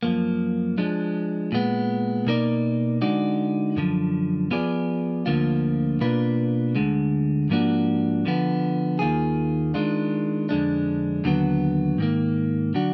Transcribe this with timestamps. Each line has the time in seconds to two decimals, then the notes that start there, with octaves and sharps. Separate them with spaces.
0.03 F#2 F3 A#3
0.78 F3 G#3 D4
1.52 A#2 G#3 B3
2.26 B2 A#3 D#4 A#4 D5
3.02 D3 G#3 D#4 F#4 D5
3.76 F#2 D3 F3
4.51 F3 B3 F4 G#4 D5
5.26 D2 D3 F3 A#3 F4
6.01 B2 A#3 D4 F4 B4
6.76 D2 D3 G#3
7.50 G#2 F3 A#3 D4 F#4
8.25 D3 F3 B3
8.99 D#2 D#3 A#3 F4 G#4
9.74 D#3 G#3 D4 F4
10.49 F2 D3 G#3 D4
11.24 D#2 D3 F#3 B3
11.98 G#2 D#3 A#3
12.75 D3 F#3 D4 F#4